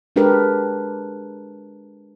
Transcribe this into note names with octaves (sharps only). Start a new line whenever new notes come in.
G#3 D4 G4 A#4 B4